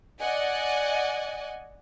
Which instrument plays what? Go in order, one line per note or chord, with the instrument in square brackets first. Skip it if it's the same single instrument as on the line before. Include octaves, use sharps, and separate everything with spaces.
[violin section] D5 D#5 F#5 G#5